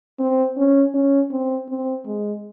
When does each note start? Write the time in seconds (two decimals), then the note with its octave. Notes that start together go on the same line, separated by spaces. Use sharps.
0.19 C4
0.57 C#4
0.94 C#4
1.31 C4
1.69 C4
2.06 G#3